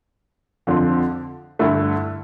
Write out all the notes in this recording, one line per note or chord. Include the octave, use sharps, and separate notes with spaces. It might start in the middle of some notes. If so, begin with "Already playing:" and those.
F2 D3 F3 C4
G2 D3 A3 E4